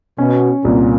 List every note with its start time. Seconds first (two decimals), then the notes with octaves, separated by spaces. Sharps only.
0.18 B2 C#4
0.65 C2 A#2